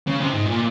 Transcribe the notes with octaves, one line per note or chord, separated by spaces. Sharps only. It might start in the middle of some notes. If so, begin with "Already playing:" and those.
C#3
C3
G#2
A#2